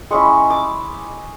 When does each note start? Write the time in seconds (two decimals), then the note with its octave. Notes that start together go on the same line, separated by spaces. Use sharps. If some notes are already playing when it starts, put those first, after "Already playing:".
0.11 G#3 C#4 E4 C#6
0.50 D6